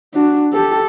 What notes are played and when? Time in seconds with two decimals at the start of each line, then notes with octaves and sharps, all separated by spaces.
0.14 D4 F#4
0.53 G4 A4